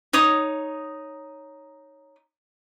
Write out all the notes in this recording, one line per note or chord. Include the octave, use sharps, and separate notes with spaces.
D#4 C#5 D#6